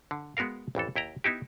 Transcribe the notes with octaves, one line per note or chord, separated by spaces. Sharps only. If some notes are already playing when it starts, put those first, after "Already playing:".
D3
G#3 B3 F#4 A#4 F5
A1 F2 E3 A4
D#2 E4 G5 A#5
B3 D#4 E4 G4